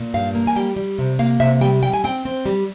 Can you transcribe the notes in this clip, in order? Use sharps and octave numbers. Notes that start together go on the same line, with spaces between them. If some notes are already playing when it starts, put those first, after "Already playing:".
Already playing: A#2
G2 F5
A#3
G#5
G3 G5
G3
C3
A#3 F5
C3 E5
G3 G5
G3 G5
G#5
C4 G5
C4
G3